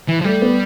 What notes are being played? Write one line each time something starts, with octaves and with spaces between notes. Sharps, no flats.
E3
F3
G3 A3
B3